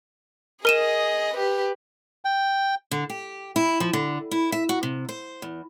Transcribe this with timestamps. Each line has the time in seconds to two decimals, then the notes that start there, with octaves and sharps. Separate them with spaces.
0.65 G#4 A#4 D#5 D#7 E7
1.34 G4 B4
2.25 G5
2.91 D3
3.10 G4
3.56 E4
3.80 F3
3.93 D3
4.31 E4
4.52 E5
4.69 F#4
4.83 C3
5.09 C5
5.42 E2